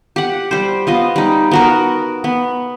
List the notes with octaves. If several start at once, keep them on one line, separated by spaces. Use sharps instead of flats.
G4 F#5
G3 C5
B3 F4 D#5
G3 D#4
B3 F#4 A#4
B3